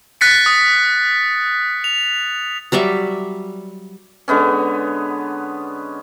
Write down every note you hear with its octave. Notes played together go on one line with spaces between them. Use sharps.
F#6 A6 B6 C#7
D#6
F7
F#3 G3 D5 E5
D3 G#3 B3 C#4